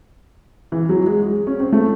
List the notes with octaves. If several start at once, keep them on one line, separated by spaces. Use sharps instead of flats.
E3
F#3
G#3
G#3
C#4
C4
A3